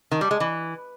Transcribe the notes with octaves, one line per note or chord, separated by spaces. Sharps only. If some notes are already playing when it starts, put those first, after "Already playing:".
D#3
G3
G#3
E3